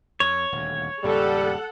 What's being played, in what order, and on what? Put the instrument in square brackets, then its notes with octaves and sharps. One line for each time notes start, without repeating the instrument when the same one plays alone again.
[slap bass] F2 [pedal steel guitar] C#5
[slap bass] D#1 D2
[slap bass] G#1 D#2 C#3 [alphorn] G3 [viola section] A4 F#5